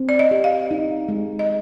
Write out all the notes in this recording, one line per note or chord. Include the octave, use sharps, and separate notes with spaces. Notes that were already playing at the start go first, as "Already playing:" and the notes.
Already playing: C4
D5
D#5
G4
F5
D#4
G#3
D#5